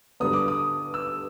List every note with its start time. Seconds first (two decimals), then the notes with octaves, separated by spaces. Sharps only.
0.20 G2 D3 G3 B3 D#6
0.33 D6
0.48 D#6
0.94 E6